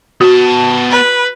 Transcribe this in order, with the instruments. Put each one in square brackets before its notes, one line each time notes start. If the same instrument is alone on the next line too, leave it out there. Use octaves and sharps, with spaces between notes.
[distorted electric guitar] B3 A5 [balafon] F#4
[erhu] B4